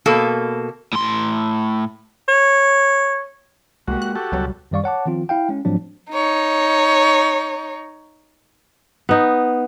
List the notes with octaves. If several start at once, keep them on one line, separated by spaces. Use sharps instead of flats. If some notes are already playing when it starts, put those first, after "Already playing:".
B2 A#3 A4
A2 C6
C#5
C2 G#3 A#3 F#4 G4
F#6
F#4 G4 A4
C#2 B2 F#3 G3
F#2 D#3 G3 D5 F5 C#6
C#5 F#5 A5 D6
D#3 F3 C4 F4
E4 F5 G5
G#3 C#4
G#2 F3 F#3 A3 C4 D4
D#4 C#5
B3 D#4